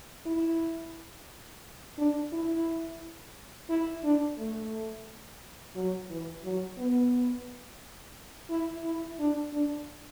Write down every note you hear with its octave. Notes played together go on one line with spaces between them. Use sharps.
E4
D4
E4
E4
D4
A3
F#3
E3
F#3
B3
E4
E4
D4
D4